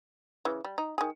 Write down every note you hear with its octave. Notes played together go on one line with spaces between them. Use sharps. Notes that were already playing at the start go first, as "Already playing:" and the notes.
C#3 E3
G3
D#4
D#3 G#4